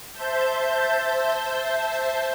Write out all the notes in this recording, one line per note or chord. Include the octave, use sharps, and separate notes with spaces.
C5 E5 A5 G6